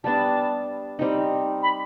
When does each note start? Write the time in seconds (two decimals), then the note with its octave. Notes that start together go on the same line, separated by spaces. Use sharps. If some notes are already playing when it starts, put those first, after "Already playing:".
0.04 G3 B3 D4 A5
0.99 G3 C4 D#4
1.63 B5